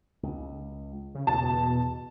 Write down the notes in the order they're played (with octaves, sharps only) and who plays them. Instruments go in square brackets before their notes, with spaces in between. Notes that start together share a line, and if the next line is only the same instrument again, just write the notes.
[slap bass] C#2
[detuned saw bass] C#3
[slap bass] E2 [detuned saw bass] B2 [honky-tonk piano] A5